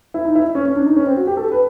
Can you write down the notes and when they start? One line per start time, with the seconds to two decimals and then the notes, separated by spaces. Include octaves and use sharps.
0.14 E4
0.25 D#4
0.35 E4
0.55 C#4
0.65 C#4
0.76 D4
0.86 D#4
0.96 C#4
1.07 C4
1.17 F#4
1.27 G4
1.37 A4
1.52 B4